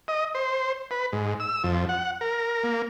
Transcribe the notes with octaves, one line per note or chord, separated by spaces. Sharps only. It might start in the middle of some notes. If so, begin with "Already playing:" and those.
D#5
C5
B4
G#2
E6
F2
F#5
A#4
A#3